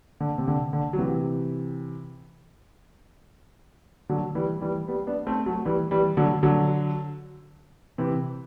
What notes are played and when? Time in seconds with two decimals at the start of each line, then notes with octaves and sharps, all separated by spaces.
0.20 D3
0.38 C3
0.48 D3
0.73 D3
0.93 F#3
0.98 C3 E3
4.09 D3 F#3
4.35 E3 G3
4.61 E3 G3
4.88 G3 B3
5.07 B3 D4
5.27 A3 C4
5.46 F#3 A3
5.65 E3 G3
5.91 E3 G3
6.17 D3 F#3
6.43 D3 F#3
7.98 C3 E3